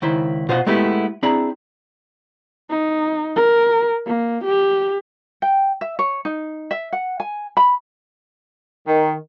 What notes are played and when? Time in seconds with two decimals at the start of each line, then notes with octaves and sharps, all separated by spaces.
0.02 C#2 D#3 E4 C5
0.49 B2 F4 C5 D#5 F5 F#5
0.67 G#3 A3 B3 E4 G4
1.23 C4 D4 E4 G#4 A#5 B5
2.70 D#4
3.36 A#4
4.07 A#3
4.44 G4
5.42 G5
5.81 E5
5.99 C#5
6.25 D#4
6.71 E5
6.93 F#5
7.20 G#5
7.57 B5
8.88 D#3